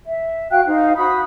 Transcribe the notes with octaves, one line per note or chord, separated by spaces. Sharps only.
E5
F#4 F5 G5 F#6
D#4 C5 F5
F#4 C5 B5 D#6